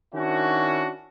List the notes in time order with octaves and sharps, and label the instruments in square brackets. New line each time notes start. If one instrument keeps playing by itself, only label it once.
[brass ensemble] D#3 C#4 D4 E4 F#4